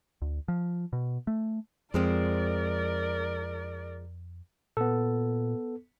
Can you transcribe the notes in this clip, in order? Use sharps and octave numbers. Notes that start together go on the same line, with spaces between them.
D2
F3
B2
A3
F2 F3 G#3 C4 A#4 D5
A#2 B3 A4